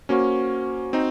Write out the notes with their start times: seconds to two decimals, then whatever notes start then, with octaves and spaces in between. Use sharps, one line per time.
0.09 A#3 C#4 F#4 C5 F#5 C#6
0.93 C4 D#4